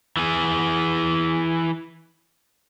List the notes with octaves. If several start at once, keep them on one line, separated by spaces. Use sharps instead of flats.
E3 G#4